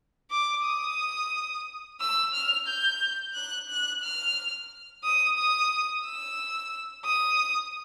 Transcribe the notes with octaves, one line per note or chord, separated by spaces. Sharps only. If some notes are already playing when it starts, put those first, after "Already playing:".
D6
D#6
E6
F6
G6
F#6
F#6
F6
D#6
D#6
E6
D#6